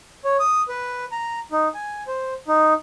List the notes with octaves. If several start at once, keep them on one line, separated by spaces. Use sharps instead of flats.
C#5
D#6
B4
A#5
D#4
G#5
C5
D#4